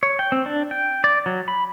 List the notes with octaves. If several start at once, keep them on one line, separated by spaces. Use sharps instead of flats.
C#5
G5
C4
D4
G5
D5
F#3
B5